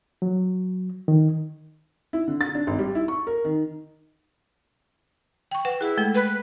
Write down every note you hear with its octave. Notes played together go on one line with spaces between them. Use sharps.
F#3
D#3
E4
D3
A6
D4
G#1
G3
E4
C#6
A#4
D#3
G5 C#6
B4 F#5
E4 G#4 B4
G#3 A3 A4
B4